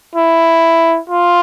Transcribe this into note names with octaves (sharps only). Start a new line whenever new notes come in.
E4
F4